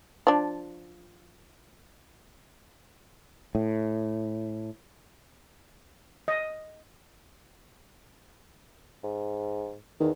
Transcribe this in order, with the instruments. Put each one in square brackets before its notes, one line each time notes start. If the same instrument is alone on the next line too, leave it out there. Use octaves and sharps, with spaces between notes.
[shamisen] F3 D4
[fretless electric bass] A2
[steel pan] D#5
[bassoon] G#2
[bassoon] E2 [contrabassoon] D#3